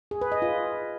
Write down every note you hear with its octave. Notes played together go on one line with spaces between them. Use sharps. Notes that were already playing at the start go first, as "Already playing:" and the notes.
G#4
B4
D#5
F4